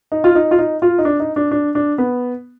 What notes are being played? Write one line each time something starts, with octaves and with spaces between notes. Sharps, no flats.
D#4
F4
D#4
F4
D#4
F4
D#4
D4
D#4
D4
D4
D4
B3